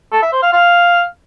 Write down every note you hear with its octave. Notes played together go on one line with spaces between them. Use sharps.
A4
E5
C5
F5
F5